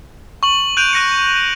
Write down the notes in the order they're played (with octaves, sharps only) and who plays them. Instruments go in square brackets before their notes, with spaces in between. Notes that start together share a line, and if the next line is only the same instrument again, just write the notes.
[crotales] C#6 F#7
F#6 G6 D7 D#7 F7
F#6 A#6 C#7